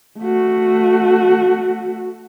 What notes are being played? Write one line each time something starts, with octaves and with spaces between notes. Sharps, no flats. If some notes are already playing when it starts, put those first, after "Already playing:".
A3 F#4